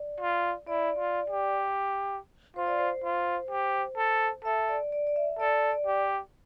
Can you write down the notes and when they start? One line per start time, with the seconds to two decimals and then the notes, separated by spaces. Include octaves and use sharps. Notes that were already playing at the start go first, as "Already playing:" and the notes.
Already playing: D5
0.21 F4
0.67 E4 D5
0.99 F4
1.30 G4
2.56 F4 C5
2.67 D5
2.78 C5
3.04 F4
3.50 G4
3.97 A4
4.45 A4 E5
4.69 D5
4.92 D5
5.07 D5
5.16 E5
5.39 A4 D5
5.71 D5
5.87 G4